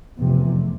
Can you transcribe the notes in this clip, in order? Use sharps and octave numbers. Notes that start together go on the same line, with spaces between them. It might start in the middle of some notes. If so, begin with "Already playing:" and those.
F1 E2 C3